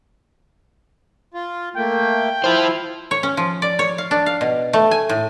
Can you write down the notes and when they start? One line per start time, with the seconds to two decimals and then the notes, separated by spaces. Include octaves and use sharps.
1.34 F4
1.76 A3 A#3 G5
2.44 E4 F4 C5
3.11 C#5
3.23 C#4
3.37 F3
3.62 D5
3.79 C#5
3.98 F5
4.11 D4
4.26 F5
4.41 B2
4.73 A3
4.91 G#5
5.09 A2